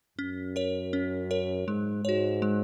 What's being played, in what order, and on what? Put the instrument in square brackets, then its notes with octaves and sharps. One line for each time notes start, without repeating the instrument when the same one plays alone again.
[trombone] F#2 [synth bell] C#4
[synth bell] A#4 C#5
C#4
A#4 C#5
[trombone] G#2 [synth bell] G#3
[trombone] G#2 [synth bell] F#4 C#5
[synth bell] G#3